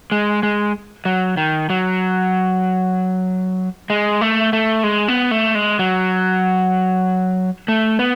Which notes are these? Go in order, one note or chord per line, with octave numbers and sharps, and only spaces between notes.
G#3
G#3
F#3
D#3
F#3
G#3
A3
A3
G#3
B3
A3
G#3
F#3
A3
B3